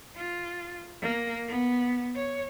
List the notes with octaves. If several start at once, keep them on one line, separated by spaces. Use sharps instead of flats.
F4
A#3
B3
C#5